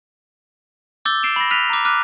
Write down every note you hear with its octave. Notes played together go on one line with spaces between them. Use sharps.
D6 E6 G6 A6 G7
C7 D7 E7 F7
B5 A#6
F6 F#6 A#6 B6 D#7 F7
A#5 D6
D6 F6 F#6 B6 D#7